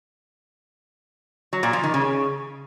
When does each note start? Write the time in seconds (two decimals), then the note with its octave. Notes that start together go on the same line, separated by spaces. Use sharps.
1.53 F#3
1.63 A#2
1.73 F3
1.83 D#3
1.94 C#3